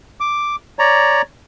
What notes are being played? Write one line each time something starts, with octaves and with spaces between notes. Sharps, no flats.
D6
C#5 D5 A#5